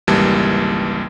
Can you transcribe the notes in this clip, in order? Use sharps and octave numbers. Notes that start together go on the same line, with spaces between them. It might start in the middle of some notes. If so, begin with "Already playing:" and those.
G#1 C#2 E3 G3 A#3 A5